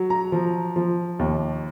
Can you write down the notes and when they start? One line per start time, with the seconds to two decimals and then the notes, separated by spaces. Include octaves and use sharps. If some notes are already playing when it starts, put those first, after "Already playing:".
Already playing: F#3
0.10 A#5
0.32 F3
0.76 F3
1.19 D#2